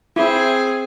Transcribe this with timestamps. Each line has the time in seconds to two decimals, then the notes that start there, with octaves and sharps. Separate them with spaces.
0.16 C4 E4 G#4